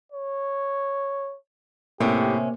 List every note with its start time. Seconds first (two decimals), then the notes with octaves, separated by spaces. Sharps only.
0.12 C#5
2.00 A2 C3 A#3 C#4 G4